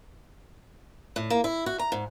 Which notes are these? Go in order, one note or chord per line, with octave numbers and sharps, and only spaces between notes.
A2
A#3
E4
F#4
A#5
G#2